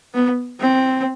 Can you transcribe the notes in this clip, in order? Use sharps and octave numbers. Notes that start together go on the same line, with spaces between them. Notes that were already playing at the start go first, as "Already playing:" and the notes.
B3
C4